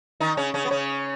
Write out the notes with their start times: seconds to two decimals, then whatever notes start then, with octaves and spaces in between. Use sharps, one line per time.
0.20 D#3 D#4
0.37 C#3 C#4
0.54 C#3 C#4
0.65 B3
0.70 C#3 C#4